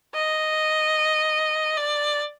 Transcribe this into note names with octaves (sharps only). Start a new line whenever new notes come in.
D#5
D5